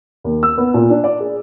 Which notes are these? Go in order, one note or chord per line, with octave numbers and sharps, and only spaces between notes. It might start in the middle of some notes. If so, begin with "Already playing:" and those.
D#2
E6
B3
A#2
D4
D5
G#4